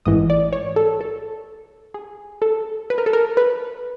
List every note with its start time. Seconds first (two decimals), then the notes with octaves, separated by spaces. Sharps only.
0.05 A1 G#2 E3 D#5
0.30 D5
0.53 C#5
0.76 A4
1.01 A4
1.94 G#4
2.42 A4
2.90 B4
2.98 A#4
3.06 A4
3.13 A#4
3.37 B4